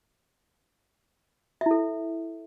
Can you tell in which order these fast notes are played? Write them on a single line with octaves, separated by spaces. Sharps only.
E5 E4 A4